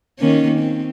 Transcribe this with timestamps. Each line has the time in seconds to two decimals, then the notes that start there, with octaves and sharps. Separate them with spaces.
0.19 D#3 A#3 C#4
0.59 C4